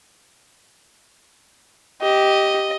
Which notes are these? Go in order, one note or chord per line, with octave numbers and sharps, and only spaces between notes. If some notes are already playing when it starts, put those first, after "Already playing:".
G4 D#5